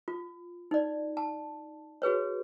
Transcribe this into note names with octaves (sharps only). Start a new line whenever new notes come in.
F4
D#4 D5
A5
F#4 G#4 B4 C#5